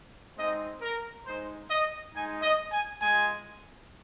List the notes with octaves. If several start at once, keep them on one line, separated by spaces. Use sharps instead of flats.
G#3 C4 D#4 D#5
A#4
G#3 D#4 C5
D#5
G#3 D#4 G#5
D#5
G#5
G#3 F4 G#5